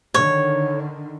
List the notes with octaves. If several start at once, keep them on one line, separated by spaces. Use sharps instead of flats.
D3 D#3 C#5